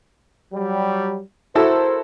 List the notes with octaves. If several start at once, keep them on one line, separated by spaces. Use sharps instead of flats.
F#3 G3
E4 F#4 A4 A#4 C5